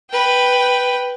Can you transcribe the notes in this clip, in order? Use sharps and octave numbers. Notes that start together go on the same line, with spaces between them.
B4 G5